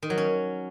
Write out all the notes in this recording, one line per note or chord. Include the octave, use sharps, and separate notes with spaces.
D#3
F#3
C#4